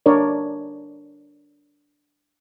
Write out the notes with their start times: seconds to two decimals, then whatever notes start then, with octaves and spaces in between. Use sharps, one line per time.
0.06 D4 A#4 C#5 D5